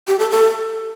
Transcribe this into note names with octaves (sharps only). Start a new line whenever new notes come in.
G4
A4
A4